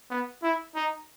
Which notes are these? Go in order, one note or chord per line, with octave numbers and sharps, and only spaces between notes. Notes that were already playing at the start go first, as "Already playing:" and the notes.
B3
E4
D#4